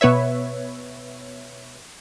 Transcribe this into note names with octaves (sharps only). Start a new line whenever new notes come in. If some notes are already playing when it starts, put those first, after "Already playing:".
B2 B3 B4 C#5 E5